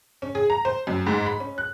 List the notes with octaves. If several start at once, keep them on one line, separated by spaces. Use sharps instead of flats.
C#4
G#4
A#5
C5
F#2
G#2
B5
C#4
F#6